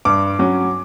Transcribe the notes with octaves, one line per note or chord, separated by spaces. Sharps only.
G2 D6
F#3 C#4